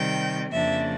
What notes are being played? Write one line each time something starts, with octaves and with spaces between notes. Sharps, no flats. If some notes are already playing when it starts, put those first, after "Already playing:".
Already playing: C3 D#3 G3 G5
F2 C#3 F3 A#3 D4 E5